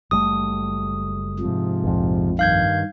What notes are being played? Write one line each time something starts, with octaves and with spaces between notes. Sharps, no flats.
F#1 G3 A3 D#6
G#2 C3 F3
A#1 F2
G2 D#3 F5 G6 G#6